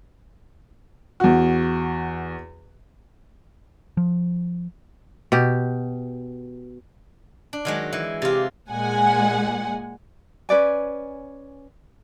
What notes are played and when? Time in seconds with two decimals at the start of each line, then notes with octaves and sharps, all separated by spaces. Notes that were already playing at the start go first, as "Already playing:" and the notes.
1.20 E2 F#4
3.97 F3
5.32 B2 G4
7.53 D4
7.65 D#3 F#3 G#3
7.93 E3
8.22 C3 F4 G4
8.70 A#2 G#3 F#5 G#5
10.49 C#4 B4 D5 G#5